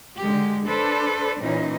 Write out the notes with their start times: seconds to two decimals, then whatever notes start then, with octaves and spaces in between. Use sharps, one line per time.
0.18 D3 G#3 G4
0.65 D4 A4 B4 C5 D5
1.42 A#2 E3 C#4 D#4